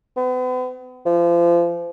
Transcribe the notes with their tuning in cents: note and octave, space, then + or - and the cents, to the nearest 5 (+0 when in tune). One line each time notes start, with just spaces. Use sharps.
B3 +40
F3 -30